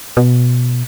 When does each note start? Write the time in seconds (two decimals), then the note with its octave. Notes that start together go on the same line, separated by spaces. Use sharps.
0.17 B2